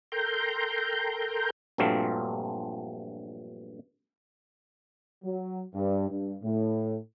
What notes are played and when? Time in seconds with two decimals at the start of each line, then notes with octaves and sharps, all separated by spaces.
0.12 A4 A#4 G5 A#5 C6 G6
1.78 A#1 G2 F#3 A3 C4 F4
5.24 F#3
5.74 G2
6.09 G2
6.43 A2